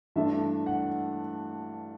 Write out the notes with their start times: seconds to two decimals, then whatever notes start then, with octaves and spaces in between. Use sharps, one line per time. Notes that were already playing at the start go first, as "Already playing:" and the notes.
0.16 G2 E3 A3 D4 E5
0.66 F#5